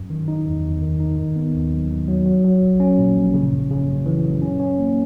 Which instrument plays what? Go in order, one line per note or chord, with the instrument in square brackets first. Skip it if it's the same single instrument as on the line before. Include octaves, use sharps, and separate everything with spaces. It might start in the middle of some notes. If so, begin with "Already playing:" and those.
Already playing: [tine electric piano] F#2
D#3
D#4
E2
E2
D#3
D#4
D#3
B3
D#2
F#3
D#3
F#3
F#3
F#3
A#1
C#4
A#2
A#1
C#3
F#2
C#3
F#2
E3
F#2
C#4
C#4
A#3